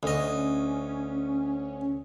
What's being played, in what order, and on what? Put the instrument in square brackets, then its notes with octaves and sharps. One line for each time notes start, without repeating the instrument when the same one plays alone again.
[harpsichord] D2 D#5 [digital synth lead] C#4